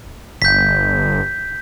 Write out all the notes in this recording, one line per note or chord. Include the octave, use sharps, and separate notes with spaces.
G1 G6 B6